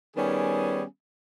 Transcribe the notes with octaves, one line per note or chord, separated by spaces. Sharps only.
D#3 G3 B3 C#4 G#4